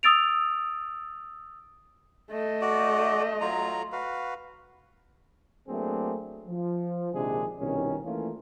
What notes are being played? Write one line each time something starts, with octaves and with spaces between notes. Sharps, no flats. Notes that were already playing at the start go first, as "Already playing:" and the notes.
D#6 E6 A6 D7 F7
A3 D#5
F#4 D5
F#3 F4 A#5
F#4 B4 F5
F#3 A3 A#3 C4 D4 G#4
F3
A#1 C3 D#3 G#3 D4 G#4
C2 B2 D#3 C#4
E3 A3 A#3 C#4 F4